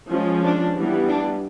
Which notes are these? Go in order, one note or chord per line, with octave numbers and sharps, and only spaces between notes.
F3 G#3 C#4
D4
E3 G3 B3
D4